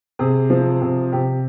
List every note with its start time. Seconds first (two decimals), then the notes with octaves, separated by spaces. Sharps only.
0.19 C3 G#4
0.50 F3
0.82 C3
1.12 C3 G4